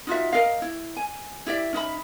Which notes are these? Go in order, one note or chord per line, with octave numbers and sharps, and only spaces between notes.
D#4 F4 F#4 E5
A#4 D#5 F5
E4
G#5
E4 G4 D5 E5
C#4 D#4 E5 B5